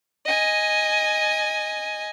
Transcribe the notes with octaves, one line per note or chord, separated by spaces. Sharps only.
D#5 G#5